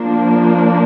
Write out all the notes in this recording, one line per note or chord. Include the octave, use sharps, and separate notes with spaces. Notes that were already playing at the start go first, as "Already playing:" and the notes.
Already playing: F3 A#3 D4